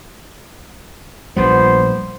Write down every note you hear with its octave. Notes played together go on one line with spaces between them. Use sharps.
A#1 A#2 G3 B3 C5